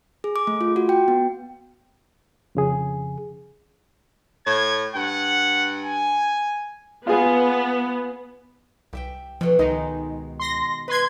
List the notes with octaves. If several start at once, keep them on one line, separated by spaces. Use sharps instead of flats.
G#4
D6
A3
F4
F#4
G5
B3
F2 C#3 G#4
A2 G#6
G2 F#5
G#5
B3 F4 G#4
C2 G4 E5 G5
B2 F3 A3 D4
C#2 D#3 G#3 D#4
C6 A#6
D#4 B4 C6 G#6